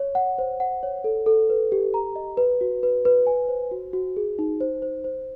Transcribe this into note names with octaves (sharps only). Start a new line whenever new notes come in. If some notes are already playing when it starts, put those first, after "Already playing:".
Already playing: C#5
F#5
C5
F#5
C#5
A4
A4
B4
G4
A#5
D#5
B4
F#4
B4
B4
G#5
C5
F#4
F#4
G#4
D#4
C5
C5
C5